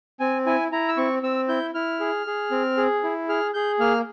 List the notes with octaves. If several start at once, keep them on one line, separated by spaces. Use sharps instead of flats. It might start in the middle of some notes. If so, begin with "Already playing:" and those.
C4 G#5
E4 G#5
E4 A#5
E6
C4 C#6
C4 E6
E4 G6
E4 F6
G#4
G#4
C4
G#4
E4
G#4 F6
G#4 G6
A#3 F6